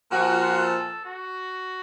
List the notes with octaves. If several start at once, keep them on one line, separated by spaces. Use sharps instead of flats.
A#2 F3 F#4
A4
F#4